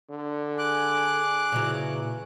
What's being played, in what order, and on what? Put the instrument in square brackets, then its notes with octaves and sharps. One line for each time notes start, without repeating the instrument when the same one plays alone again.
[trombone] D3
[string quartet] G#4 [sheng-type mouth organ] D6 F#6
[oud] A#2 C#3 F#3 [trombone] E3